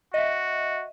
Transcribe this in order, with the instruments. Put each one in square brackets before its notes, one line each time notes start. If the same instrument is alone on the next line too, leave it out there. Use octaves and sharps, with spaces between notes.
[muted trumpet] F#4 [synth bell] D#5 E5